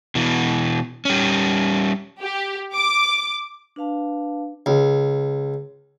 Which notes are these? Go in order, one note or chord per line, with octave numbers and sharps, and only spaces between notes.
B2 E3
G3 C#4
G4
D6
D4 B4 F5 A5
C#2